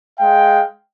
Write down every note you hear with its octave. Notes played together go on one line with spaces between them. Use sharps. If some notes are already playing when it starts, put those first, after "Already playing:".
G#3 F5 G5